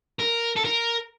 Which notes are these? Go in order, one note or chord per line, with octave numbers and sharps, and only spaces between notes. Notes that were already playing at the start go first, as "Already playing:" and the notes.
A#4
A4
A#4